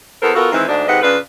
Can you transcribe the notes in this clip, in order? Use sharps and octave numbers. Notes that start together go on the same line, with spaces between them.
E2 B3 A4 A#4 C5
B3 F4 F#4 A4 A#4
D#3 E3 G#3 C4
D2 G#2 D4
G#2 C3 B4 D#5 F#5
C#3 D4 F4 B4